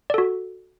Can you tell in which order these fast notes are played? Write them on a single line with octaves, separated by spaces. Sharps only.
D5 A4 F#4